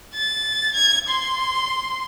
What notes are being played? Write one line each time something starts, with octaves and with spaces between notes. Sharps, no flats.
A6
G#6
C6